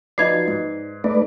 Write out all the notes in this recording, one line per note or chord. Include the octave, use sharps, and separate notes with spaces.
F3 F#3 D#4 B4 D5 D#5 G#6 C7
G#2
A3 D#4 B4 D5